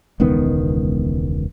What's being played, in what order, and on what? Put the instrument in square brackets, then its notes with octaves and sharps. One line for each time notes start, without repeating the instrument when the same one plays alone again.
[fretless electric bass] E1 C#2 D#3 B3